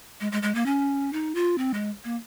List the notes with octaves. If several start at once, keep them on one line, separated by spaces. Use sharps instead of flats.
G#3
G#3
G#3
A#3
C#4
D#4
F4
C4
G#3
A#3